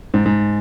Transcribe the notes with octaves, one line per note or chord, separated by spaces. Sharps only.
G#2
G#2